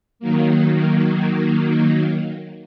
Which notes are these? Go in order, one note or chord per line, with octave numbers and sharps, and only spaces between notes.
D#3 F#3 A#3